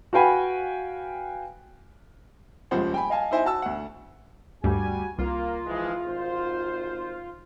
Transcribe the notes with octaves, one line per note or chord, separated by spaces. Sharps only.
F#4 B4 F5 G5 G#5 B5
D#1 C#2 C#3 F3 C5 F#5
G5 G#5 B5
D#5 F5 G#5 A5
D#4 E4 C5 E5 G#5
F#4 A5 E6
D2 F#5
D2 G2 G3 F#4 G4 G#5
C2 A#3 F4
E3 F3 G#3
G#1 C5